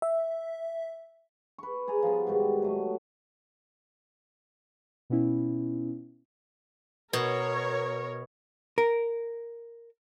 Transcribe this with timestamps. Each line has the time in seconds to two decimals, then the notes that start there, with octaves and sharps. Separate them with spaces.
0.02 E5
1.58 B4 C#6
1.88 G#4 D5 G#5 A#5
2.03 F3 G3 B3
2.27 G#2 D#3 G3 F#4
2.62 F#3 A3 D#5
5.10 B2 B3 C#4 E4
7.13 B2 A#4 C#5
8.78 A#4